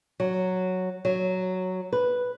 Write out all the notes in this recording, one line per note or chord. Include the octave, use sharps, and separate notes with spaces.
F#3
F#3
B4